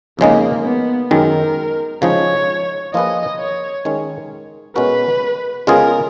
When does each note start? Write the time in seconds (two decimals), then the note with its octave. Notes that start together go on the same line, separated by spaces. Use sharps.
0.19 F2 C#3 G#3 A#3 D#4
0.64 B3
1.10 F#2 D#3 G#3 A#4
2.02 C#3 F3 G#3 D#4 G#4 C#5
2.94 F3 A#3 F4 G#4 B4 D#5
3.39 C#5
3.85 D#3 G#3 C#4
4.76 B2 G#3 C#4 F#4 A#4 B4
5.67 C#3 G#3 B3 F4 G#4 A#4